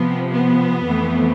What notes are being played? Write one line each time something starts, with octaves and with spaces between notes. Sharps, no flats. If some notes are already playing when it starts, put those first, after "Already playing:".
Already playing: C3 F3 B3
B3
F2 E3 A3